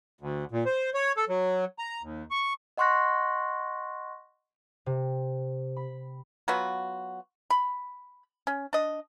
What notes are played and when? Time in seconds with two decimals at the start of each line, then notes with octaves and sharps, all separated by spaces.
0.21 D2
0.52 A#2
0.66 C5
0.94 C#5
1.17 A4
1.29 F#3
1.79 A#5
2.03 D#2
2.31 C#6
2.78 D#5 F#5 C6 C#6 F#6 A#6
4.86 C3
5.77 B5
6.48 F#3 B3 F4 F#4
7.50 B5
8.47 C#4
8.73 D4 D#5